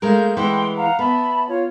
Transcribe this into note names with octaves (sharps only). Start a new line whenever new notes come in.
G#3 A3 A#4 F5 G6
E3 G#3 E4 F#5 G5 C6
F5 F#5 A#5
B3 E5 A5 B5
F4 C#5